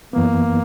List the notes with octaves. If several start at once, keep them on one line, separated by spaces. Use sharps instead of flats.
F#2 E3 A#3 B3